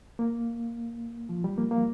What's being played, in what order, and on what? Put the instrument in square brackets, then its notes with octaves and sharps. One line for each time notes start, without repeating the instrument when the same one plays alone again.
[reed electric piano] A#3
F3
G3
A#3
A#3